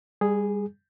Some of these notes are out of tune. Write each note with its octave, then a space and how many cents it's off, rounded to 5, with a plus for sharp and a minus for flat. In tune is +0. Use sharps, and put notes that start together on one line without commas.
G3 +30 G#4 +0